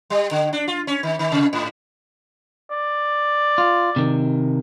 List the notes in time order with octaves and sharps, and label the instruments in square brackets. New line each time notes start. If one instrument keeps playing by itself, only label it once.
[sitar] G3
D3
D4
F4
C#4
D#3
D#3
C3
G#2
[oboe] D5
[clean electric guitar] F4
C3 D#3